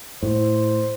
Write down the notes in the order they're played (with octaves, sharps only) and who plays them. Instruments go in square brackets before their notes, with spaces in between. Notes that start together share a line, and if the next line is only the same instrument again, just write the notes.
[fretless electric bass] A2 [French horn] C5